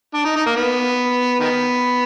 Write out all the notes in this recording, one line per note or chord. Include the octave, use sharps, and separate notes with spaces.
D4
D#4
D#4
A#3
B3
D#3 B3